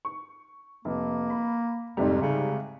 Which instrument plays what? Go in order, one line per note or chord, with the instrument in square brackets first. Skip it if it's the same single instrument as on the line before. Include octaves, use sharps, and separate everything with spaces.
[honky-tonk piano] C#6
[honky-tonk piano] F1 [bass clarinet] A#3
[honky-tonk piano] B5
[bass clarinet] F2 [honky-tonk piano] G#2 C3 G3
[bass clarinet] C#3